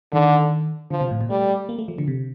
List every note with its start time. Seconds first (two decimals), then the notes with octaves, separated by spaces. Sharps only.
0.13 D3 D#3
0.91 D3 F3
1.01 C3
1.11 A2
1.21 A#2
1.30 G3 A3
1.69 A#3
1.79 A3
1.88 F3
1.98 D3
2.08 C3